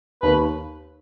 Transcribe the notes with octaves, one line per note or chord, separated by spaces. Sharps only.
D#2 D#3 A#3 B4